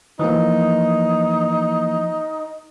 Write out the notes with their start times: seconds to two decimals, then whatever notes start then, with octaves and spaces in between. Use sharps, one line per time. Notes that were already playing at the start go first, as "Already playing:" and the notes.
0.19 E3 F3 A#3 D#4